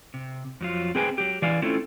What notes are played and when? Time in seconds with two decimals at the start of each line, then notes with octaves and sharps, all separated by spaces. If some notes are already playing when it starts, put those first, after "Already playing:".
0.14 C3
0.61 F2 F#3 F4
0.95 C4 G#4 B4 G5 G#5
1.18 F#3 G4
1.42 E3 D5 F5 G#5
1.62 A3 C4 C#4 E4 F4 A4